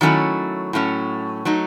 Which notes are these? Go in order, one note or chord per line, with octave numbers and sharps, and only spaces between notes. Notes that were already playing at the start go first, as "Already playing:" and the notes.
D#3 F#3 A3 C#4 E4
A2 F#3 A3 C#4
F#3 A3 D#4